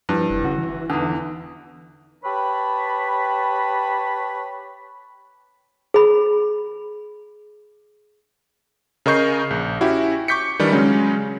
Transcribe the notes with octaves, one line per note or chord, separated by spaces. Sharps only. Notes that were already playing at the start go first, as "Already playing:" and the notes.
G2 F3 E4
F1
C#3 F#4
E3
E2 D3 D#4 D#6
G4 B4 C#5 A5 B5
G#4 B5
C#3 A#4 D#5 C#6 G6 C7
A#1
C#4 E4 F#4 G4
C#6 D6 G6 B6 C#7
D#3 E3 G3 D4
C#3 F#3 G#3 C#4